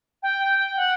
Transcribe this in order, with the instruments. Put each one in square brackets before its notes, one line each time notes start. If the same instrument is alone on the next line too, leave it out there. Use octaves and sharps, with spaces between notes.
[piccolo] G5
F#5